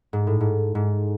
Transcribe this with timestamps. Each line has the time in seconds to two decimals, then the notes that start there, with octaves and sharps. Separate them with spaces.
0.13 G#2
0.27 A2
0.40 G#2
0.75 G#2